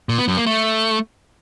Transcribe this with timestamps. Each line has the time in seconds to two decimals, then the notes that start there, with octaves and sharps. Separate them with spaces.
0.09 A#2
0.18 B3
0.28 F#2
0.37 A#3
0.46 A3